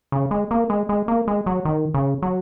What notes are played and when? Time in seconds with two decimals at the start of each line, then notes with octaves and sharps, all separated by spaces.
0.12 C#3
0.31 G#3
0.51 A#3
0.70 G#3
0.89 G#3
1.08 A#3
1.28 G#3
1.46 F#3
1.65 D#3
1.94 C#3
2.22 F#3